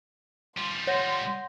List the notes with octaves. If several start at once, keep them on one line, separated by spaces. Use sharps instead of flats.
G3 F4 C6
C#5 F#5 G6 A#6